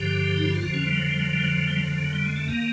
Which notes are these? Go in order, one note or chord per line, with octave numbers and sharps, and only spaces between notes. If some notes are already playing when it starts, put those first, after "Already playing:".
Already playing: G2 D3 F3 G4
D#4
E4
F4
F2 D3 F3 F#4
C#4
G3
F#3
G3
F#3
G3
F#3
F#3
G3
F#3
F3
F#3
G3
G#3
A3
D#3 A#3